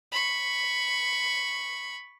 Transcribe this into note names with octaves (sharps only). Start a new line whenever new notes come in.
B5 C#6